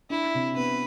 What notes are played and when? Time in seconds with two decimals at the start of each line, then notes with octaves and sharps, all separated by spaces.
0.10 D4 E4
0.34 C3
0.57 B3 B4